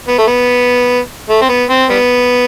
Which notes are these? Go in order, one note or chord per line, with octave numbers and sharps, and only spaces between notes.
B3
A3
B3
A3
C4
B3
C4
G3 B3